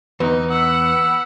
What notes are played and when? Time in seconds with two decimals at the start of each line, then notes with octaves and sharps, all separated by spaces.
0.20 E2 D#4 B4
0.51 F#5 B5 E6